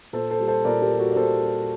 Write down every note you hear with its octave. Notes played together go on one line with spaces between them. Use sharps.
A#2 A4 C5
A4 C5
G3
A4 C5
A#2 A#4 D5
G4 A#4
G3
F#4 A4
D5
A#2 A4 C5
G3